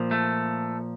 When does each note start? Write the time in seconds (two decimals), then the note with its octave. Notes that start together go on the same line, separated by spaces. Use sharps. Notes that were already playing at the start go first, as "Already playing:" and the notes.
Already playing: A#2 F3
0.11 A3